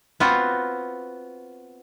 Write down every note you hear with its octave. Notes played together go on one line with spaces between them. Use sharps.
B3 C4 F4 F#4